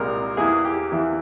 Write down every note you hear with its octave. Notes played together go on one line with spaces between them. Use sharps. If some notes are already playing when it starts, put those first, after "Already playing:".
Already playing: C2 A#2 G#3 A#4
E2 E3 A#3 E4 G#4
G4
E2 E3 A#3 E4